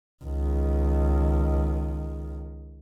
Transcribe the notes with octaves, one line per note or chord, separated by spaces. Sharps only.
C#2 D#3